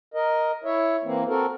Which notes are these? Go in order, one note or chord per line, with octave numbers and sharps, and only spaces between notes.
A#4 D#5
E4 C#5 E5
E3 A#3 C4
C4 F#4 A4 A#4